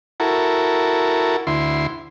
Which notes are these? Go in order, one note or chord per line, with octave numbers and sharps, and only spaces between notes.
E4 F#4 A4 A#4
D2 E4 C6